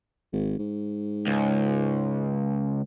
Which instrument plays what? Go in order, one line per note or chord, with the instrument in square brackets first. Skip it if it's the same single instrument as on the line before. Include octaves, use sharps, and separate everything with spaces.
[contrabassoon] G#1
G#2
[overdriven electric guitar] C#2